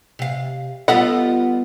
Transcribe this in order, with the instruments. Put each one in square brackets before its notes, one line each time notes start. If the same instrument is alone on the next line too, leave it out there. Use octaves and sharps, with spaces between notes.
[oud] C3 F5
[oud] G3 B3 F4 [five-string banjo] A4 D#5 F#5